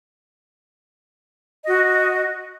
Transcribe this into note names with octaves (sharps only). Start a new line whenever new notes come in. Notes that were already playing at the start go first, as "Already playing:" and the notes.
F#4 D#5